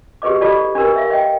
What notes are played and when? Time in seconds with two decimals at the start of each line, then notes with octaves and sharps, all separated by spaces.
0.22 G4 G#4 B4 D#5 D6
0.41 E4 F4 G4 A4 D5 D#5
0.75 D4 G4 A#4 B4
0.96 E5 F5
1.10 D#5 G5